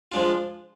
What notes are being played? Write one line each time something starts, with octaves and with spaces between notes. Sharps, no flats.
F3 G#3 D4 F4